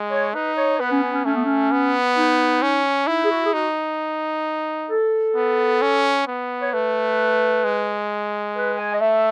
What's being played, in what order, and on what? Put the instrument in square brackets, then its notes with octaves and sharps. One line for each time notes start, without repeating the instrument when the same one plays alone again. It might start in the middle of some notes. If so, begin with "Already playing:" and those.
Already playing: [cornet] G#3
[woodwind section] C#5
[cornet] D#4 [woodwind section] B4
[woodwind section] C#5
[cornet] B3 [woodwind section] B4
[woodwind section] C#4
C#4
C#4
[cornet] A3 [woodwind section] C#4
[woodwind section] B3
C#4
[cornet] B3
[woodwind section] D#4
[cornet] C#4
[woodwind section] D#4 [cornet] E4
[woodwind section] G#4
F#4
G#4
[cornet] D#4 [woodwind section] F#4
[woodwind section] A4
[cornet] B3
C#4
B3
[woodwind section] C#5
[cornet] A3 [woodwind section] B4
[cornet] G#3
[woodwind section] B4
G#5
D#5
[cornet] A3 [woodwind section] E5